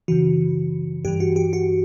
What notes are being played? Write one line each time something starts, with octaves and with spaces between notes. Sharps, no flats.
F#2 C#3 E3 F#4
G2 E3 G4
F#4
G4
F#4